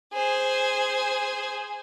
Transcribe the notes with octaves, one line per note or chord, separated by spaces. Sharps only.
G#4 C5